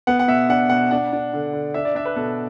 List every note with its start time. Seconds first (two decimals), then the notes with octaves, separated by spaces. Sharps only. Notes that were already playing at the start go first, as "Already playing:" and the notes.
0.07 B3 F#5
0.19 F#5
0.28 B2 E5
0.49 D4 F#5
0.70 B2 F#5
0.91 D4 F#5
1.13 D4
1.33 D3
1.53 D3
1.74 D4 E5
1.85 D5
1.95 D4 E5
2.05 B4
2.16 B2 A4